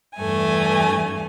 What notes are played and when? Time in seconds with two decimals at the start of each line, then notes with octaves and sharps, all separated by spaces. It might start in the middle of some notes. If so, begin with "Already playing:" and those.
0.17 E2 G2 A3 G#5